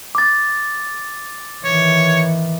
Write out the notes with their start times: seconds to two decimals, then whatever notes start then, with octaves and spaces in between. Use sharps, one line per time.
0.15 D6 A6
1.65 D#3 E3 C#5